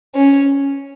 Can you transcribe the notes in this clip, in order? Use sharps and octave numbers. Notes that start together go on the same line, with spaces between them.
C#4